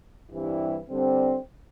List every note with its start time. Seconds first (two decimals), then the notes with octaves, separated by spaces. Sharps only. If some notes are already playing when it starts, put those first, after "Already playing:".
0.31 G2 E3 G3 C4 E4
0.89 D3 G3 C4